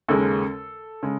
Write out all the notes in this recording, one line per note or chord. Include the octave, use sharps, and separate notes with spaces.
D#2 C#3 G#3 A4
C#3 G#3